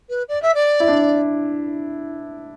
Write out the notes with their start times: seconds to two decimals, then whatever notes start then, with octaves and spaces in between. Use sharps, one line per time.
0.09 B4
0.29 D5
0.42 E5
0.55 D5
0.80 E4
0.88 D4